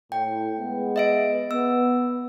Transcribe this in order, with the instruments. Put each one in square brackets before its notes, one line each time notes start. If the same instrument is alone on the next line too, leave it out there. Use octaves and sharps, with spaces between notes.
[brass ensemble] A2 [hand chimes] G5
[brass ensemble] G#3 B3
[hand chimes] D#5 E5 D7
[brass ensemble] B3 [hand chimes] E6